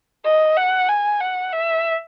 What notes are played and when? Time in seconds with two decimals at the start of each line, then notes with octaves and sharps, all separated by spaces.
0.25 D#5
0.57 F#5
0.89 G#5
1.20 F#5
1.53 E5